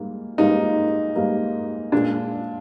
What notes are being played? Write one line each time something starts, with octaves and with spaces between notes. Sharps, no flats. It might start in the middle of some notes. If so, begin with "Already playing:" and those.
Already playing: G#2 G3 A#3
G#2 G3 A#3 D#4
G#2 G3 A#3
A#2 G#3 D4